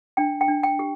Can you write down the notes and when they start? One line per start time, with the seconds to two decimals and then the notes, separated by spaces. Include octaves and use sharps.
0.17 D4 G5
0.41 G5
0.48 D4
0.63 G5
0.79 G4